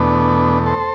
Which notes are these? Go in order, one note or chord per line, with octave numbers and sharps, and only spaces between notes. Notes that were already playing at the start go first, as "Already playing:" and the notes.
Already playing: E2 B2 A3 B3 D4
A4 C5